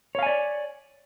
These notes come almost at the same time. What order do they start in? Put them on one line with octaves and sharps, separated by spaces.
C#5 F5 G#5 D5